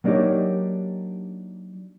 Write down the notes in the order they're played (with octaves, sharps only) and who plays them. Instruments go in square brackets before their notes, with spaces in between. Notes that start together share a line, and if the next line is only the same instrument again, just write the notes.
[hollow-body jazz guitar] F#3 A#3 D4 D#4 G4 C#5